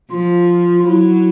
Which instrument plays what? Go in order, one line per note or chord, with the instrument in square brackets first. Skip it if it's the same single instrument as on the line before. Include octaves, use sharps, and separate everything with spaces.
[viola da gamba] F3 [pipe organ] F4
[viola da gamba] F#3 [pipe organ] E4